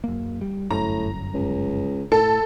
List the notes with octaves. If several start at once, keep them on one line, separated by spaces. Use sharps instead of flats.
F#2 A#3
G3
G1 F#2 A2 A#5
C#2
A2 A4